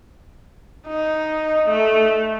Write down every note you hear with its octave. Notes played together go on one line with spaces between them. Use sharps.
D#4
A3